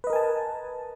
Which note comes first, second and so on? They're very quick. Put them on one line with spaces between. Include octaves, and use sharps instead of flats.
B4 D#5 A#4 G#5 A5